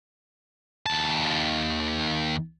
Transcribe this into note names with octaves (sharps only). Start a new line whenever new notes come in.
D#2 A5